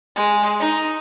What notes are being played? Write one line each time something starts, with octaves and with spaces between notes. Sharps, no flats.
G#3
D#4